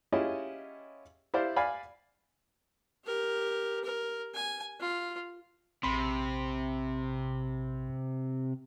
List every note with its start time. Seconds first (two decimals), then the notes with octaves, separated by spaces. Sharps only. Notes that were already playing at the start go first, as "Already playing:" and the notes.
0.12 C#4 E4 F4 G4 G#4 D#5
1.34 E4 G4 C5 D5 F5
1.56 D5 F5 G#5 B5
3.05 G4 A#4
3.84 A#4
4.34 G#5
4.80 F4
5.83 A#1 C3 B5 C6